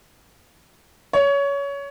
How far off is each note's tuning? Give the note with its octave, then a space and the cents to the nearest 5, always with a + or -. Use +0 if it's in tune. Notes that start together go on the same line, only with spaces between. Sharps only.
C#5 +20